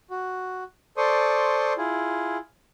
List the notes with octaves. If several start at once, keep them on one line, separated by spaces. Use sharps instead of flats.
F#4
A4 C5 D5 C6 C#6 D#6
E4 F4 G#4